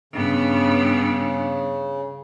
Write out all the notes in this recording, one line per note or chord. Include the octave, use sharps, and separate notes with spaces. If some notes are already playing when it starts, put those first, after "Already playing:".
G2 C#3 B3